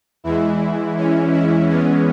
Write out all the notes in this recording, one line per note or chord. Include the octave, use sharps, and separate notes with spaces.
E2 E3 G#3 E4
C#4
E4
E2 E3 G#3 B3 C#4